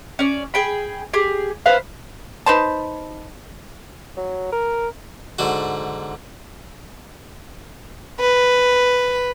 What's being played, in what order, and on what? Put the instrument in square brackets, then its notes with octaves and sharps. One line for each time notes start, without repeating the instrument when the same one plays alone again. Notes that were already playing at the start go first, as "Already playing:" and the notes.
[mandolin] C#4 D5
G#4 G5 B5
G4 G#4
B4 C5 F5
[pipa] D#4 B4 C5 A5
[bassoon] F#3
A#4
[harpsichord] G#2 D3 F#4
[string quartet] B4